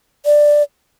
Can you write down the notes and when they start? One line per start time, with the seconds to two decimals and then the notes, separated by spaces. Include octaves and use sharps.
0.25 D5